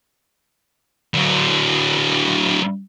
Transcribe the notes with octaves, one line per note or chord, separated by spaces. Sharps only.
D3 F#3